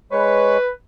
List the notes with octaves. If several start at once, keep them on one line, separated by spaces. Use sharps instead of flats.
G#3 B4 C#5 C#6